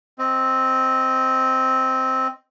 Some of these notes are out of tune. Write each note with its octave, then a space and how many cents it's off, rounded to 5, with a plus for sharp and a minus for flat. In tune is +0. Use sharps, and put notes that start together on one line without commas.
C4 +0 D#5 +0